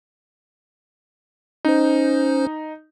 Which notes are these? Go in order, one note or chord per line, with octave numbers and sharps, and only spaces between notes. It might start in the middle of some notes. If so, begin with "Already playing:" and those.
C#4 D#4 C5